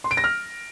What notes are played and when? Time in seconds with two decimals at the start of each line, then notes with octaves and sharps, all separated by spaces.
0.04 C6
0.11 D7
0.17 A#6
0.24 F6